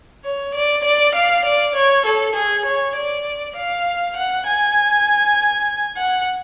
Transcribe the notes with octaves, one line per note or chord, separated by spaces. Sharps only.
C#5
D5
D5
F5
D5
C#5
A4
G#4
C#5
D5
F5
F#5
G#5
F#5